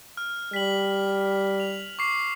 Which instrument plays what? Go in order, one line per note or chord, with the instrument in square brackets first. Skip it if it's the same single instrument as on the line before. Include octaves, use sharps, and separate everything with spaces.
[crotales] F6
[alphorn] G3 [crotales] B6 F#7
[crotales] F7
C#6 D6 C7